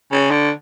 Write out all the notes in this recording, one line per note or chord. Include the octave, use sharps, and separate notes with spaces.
C#3
D3